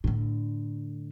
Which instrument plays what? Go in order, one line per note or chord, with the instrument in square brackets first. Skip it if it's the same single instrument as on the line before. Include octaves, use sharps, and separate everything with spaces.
[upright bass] A2 D3